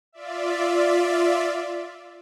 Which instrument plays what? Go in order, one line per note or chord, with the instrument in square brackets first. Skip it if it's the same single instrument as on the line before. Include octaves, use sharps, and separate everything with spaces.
[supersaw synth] F4 D5 E5